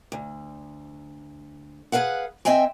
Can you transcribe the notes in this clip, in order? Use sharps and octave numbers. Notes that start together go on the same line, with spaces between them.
D2
G#4 A4 B4 F5 F#5
C4 D#5 E5 G5 G#5